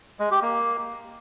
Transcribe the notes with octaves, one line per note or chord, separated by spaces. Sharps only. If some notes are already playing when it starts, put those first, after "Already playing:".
G#3
G4
A#3